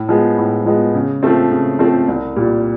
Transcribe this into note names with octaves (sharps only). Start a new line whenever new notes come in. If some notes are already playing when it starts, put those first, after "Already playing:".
Already playing: A2
F3 G#3 B3
A2
F3 G#3 B3
C#3
F3 A3 C4
C#3
F3 A3 C4
C2
A#2 G3